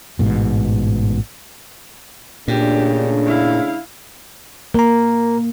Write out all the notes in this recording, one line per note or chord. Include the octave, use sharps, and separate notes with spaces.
A1 G#2 B2
A#2 C#3 A3 D4 G4
E4 F5
A#3 A#4 A#5